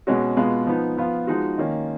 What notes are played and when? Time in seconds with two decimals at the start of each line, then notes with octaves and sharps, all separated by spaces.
0.07 B2 G#3 C#4 F#4
0.37 B2 G#3 B3 F4
0.67 F3 B3 D#4
0.97 F3 B3 F4
1.27 F3 G#3 D#4 F#4
1.58 D#3 A#3 C#4